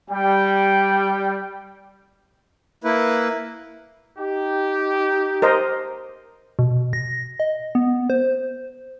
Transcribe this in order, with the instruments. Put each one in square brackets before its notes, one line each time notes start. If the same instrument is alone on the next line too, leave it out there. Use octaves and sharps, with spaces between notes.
[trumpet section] G3 [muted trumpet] G5
[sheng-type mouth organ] A#3 E4 B4
[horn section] D#4 G4
[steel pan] A#4 C5 D#5
[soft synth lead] B2
A#6
D#5
B3
C5